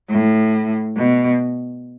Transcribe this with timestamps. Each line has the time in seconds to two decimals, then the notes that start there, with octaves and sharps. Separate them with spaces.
0.10 A2
0.97 B2